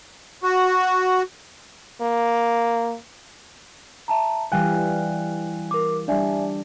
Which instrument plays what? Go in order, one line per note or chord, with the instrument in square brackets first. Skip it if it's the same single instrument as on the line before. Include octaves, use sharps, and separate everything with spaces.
[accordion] F#4
[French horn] A#3
[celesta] E5 A5 A#5
[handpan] E3 G3 F5 [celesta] G5 G#5 F#6
[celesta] A#4 D6
[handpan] G3 D4 [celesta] D5 E5 G#5